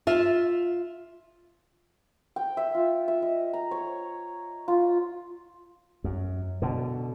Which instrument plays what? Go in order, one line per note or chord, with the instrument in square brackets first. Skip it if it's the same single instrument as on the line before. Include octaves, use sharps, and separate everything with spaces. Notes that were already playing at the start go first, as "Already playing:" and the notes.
[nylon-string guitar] F4 E5
[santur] G5
E5
F4
E5
D#5
A#5
C#5
F4
[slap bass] F#2
B2 D3